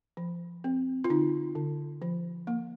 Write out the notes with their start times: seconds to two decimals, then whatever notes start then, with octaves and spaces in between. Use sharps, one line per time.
0.17 F3
0.64 C4
1.04 F4
1.09 D3 D#4
1.55 D3
2.02 F3
2.47 A#3